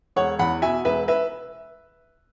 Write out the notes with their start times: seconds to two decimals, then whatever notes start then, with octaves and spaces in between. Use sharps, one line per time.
0.16 E1 C#5 F#5
0.39 E2 F#5 B5
0.62 B2 E5 G#5
0.85 E1 B4 E5
1.08 B4 E5